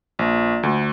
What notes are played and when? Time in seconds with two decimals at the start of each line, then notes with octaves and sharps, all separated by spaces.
0.19 A#1
0.63 D2